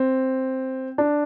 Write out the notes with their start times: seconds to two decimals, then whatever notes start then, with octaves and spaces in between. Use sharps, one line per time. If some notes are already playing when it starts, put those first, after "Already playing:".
Already playing: C4
0.98 D4